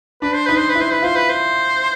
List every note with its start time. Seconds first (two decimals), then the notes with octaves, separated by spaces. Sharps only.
0.22 D4 B4
0.34 C5
0.46 D#4 B4
0.57 C5
0.69 B4
0.75 E4
0.81 C5
0.92 B4
1.02 F4 C5
1.16 B4
1.29 C5